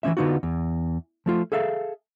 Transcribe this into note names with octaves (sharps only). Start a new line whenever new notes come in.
E3 F3 C#4 E5
D3 B3 D#4 F4 F#4
E2
F3 A3 F4
G#4 A4 E5 F5